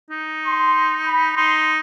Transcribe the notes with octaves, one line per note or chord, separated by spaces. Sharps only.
D#4
C6
B5
D#4 C6